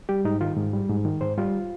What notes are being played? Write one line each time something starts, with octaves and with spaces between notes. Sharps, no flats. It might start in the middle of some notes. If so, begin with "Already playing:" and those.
G3 G4
G#2 D#4
D#3 F4
G#2
G3
G#2
D#3
G#2 C5
G3 F4